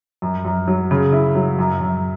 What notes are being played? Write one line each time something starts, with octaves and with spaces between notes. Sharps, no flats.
F#2
F#2
F#3
C#3
E4
F#3
F#2
F#2